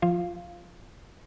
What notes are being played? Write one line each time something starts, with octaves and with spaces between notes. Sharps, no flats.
F3 F4 F5